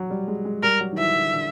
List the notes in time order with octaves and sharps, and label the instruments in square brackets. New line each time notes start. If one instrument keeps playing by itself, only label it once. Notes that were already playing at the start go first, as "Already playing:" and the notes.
Already playing: [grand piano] F#3
G3
G#3
G#3
[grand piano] G3 [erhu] A#4
[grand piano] F#3
D#3
[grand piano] E3 [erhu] E5
[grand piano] D3
D3